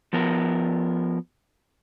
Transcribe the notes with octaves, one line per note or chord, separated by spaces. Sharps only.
F3 B3 A#4